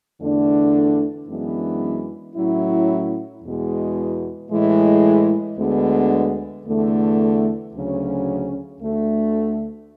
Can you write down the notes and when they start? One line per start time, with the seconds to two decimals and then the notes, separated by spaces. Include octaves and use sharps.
0.20 E2 D3 A3 D4
1.28 F#2 E3 G#3 B3 D4
2.36 A2 F#3 C#4 E4
3.43 E2 B2 G#3
4.51 A2 E3 G#3
5.59 D2 D3 G#3 B3
6.66 E2 D3 A3
7.74 D2 C#3 F#3 C#4
8.81 D2 D3 A3